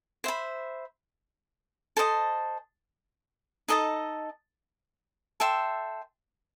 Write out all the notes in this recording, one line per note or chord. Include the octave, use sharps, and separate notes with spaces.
C5 E5 B5
A4 C5 D#5 A5
D#4 A4 D#5 A5
A4 E5 G5 C6